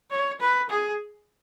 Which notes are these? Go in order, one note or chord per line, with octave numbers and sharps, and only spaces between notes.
C#5
B4
G#4